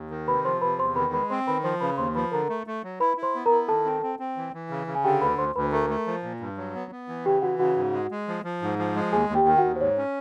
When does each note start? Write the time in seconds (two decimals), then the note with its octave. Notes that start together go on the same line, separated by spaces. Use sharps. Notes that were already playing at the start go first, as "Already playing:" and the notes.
Already playing: D#2
0.10 D#3
0.28 C3 B4 B5
0.44 F3 C5 C6
0.61 C3 B4 B5
0.79 E2 C5 C6
0.96 D#3 B4 B5
1.13 G#3 B4 B5
1.30 C4 C5 C6
1.47 D#3 B4 B5
1.64 F3 C5 C6
1.81 C#3 B4 B5
1.98 D#2 C5 C6
2.15 F3 B4 B5
2.32 D3 A#4 A#5
2.49 A3
2.67 A3
2.83 F#3
3.00 E4 B4 B5
3.17 E4
3.23 C5 C6
3.35 B3
3.46 A#4 A#5
3.51 E4
3.68 D#3 A4 A5
3.85 C4
4.03 C4
4.19 C4
4.37 E3
4.54 E3
4.70 C#3
4.87 C#3
4.95 G#5
5.04 D3 G4 G5
5.21 D2 B4 B5
5.38 D2 C5 C6
5.55 D2 B4 B5
5.72 A3 A#4 A#5
5.90 A3
6.07 F3
6.23 A#2
6.40 G2
6.57 F#3
6.75 B3
6.91 B3
7.09 E3
7.25 C#3 G4 G5
7.42 E3 F#4 F#5
7.59 C#3 F#4 F#5
7.76 G#2
7.93 G#3
8.11 G#3
8.28 F3
8.44 F3
8.62 G#2
8.79 F3
8.96 G#3
9.12 D#2 G#4 G#5
9.29 D#2
9.35 G4 G5
9.47 D#3 G5
9.58 F#4 F#5
9.64 D#2
9.76 C5
9.81 G#2 C#5
9.97 C#4